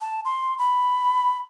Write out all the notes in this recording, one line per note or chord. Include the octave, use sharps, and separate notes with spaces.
A5
C6
B5